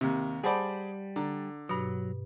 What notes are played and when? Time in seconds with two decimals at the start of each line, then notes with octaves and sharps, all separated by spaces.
0.01 D#2 C3
0.44 G3 G#4 C5 D5 F#5 A5 B5
1.16 D3 A#5
1.69 G2 B2 F#3